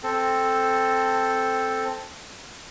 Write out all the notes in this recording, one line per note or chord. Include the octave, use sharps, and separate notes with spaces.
C4 A4